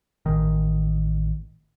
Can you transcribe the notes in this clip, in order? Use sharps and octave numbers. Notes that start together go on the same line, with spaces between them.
A1 D#3